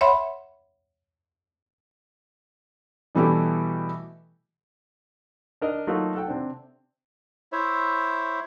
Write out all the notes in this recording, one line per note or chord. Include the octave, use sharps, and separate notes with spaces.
C#5 E5 F#5 B5 C6
B2 E3 G3 A3 E4 G4
D4 A#4 D#5
F#3 A3 A#3 D#4 F4 F#4
A4 F#5 G5
C3 C4 D4
E4 C5 C#5 E5